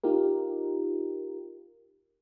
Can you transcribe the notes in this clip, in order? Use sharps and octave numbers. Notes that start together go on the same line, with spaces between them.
D#4 F4 G4 A#4